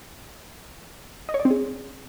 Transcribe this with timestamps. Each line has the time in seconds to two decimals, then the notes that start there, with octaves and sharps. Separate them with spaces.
1.29 D#5
1.34 C#5
1.40 D5
1.45 C4
1.51 G#4